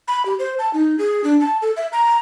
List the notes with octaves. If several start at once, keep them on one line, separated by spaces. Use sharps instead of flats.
B5
G4
C5
A5
D#4
G#4
D4
A5
A4
E5
A#5